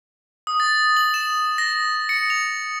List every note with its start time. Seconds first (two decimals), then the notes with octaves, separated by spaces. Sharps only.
0.47 D#6
0.60 A6
0.97 F#7
1.14 E7
1.58 A#6
2.09 C#7
2.30 F7